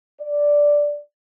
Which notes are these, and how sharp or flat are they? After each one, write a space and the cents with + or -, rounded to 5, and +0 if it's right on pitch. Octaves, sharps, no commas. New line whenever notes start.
D5 -5